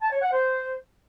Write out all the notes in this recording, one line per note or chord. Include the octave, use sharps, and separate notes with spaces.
A5
C#5
F#5
C5